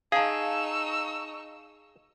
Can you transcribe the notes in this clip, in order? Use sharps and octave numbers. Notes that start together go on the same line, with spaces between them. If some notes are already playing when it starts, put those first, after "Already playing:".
D#4 G#4 F5 A5 C#6 E6